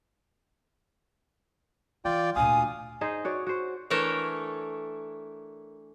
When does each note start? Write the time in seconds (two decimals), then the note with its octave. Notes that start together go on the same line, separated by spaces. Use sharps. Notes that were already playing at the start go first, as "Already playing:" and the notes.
2.05 E3 F4 D5 G5
2.36 D2 A#2 F5 G#5 D#6
3.01 D#4 G#4 C5 D#5
3.25 F#4 C#5 D5
3.47 F#4 C5
3.90 E3 A3 D4 A4 A#4 C#5